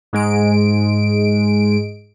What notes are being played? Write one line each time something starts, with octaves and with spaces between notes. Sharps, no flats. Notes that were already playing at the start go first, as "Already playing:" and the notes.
G#2 G#3 D7